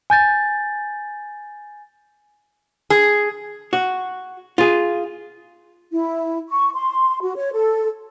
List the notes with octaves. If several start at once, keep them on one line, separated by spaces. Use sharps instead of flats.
G#5 G6 A6
G#4
F#4
F4 G#4
E4
C#6
C6
F#4
C#5
A4